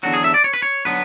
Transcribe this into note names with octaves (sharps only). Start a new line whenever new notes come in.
E2 D3 F#3 F#4
G#4
E5
D5
C#5
B4
C#5
D3 F#3 B3 B4